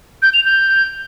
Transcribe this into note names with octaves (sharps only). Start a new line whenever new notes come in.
G6
F7
G6